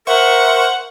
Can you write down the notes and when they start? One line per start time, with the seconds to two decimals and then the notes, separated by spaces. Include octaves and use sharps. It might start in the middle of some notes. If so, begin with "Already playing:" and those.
0.07 A#4 C5 E5 F#5 C#6